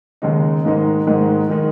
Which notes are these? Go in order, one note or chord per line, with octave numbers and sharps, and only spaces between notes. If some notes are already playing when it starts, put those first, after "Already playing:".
D#2 C#3 G#3 D#4
G#2 D#3 G#3 D#4
G#2 D#3 G#3 D#4
D#3 G#3 D#4